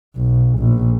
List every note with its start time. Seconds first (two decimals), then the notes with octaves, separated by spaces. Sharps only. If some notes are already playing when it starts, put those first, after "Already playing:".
0.16 B1
0.58 A#1